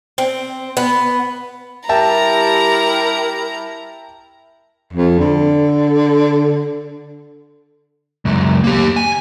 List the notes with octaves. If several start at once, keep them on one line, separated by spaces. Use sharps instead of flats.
C4
B3
G3 E4 G4 A#4 E5 G5 A5 A#5
F2
D3
C#2 F#2
A#3 G4
G#5